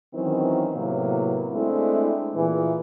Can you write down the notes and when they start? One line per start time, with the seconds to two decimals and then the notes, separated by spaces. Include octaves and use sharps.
0.14 D#3 E3 F#3 C4 C#4 E4
0.75 A2 C3 F#3 A#3 B3 E4
1.53 G#3 A3 C4 D4 E4
2.35 A#2 E3 G#4